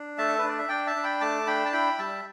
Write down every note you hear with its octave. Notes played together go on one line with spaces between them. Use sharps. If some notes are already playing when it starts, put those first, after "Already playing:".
Already playing: D4
A3 E5 A5
A4
B4
D4 D5
E5
D4 D5 G5
E5 A5
D4
G5 B5
A3 A5 D6
D4 G5 B5
A5
E4 G5 B5
G3 E5 A5